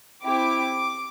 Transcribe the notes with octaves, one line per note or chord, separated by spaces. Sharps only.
C4 E4 G4 D6